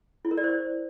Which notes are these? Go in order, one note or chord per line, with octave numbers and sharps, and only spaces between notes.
E4
A#4
D5
C5